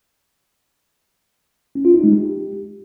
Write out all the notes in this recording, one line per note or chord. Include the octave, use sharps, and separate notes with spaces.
C#4
F4
D#4
G#3
G4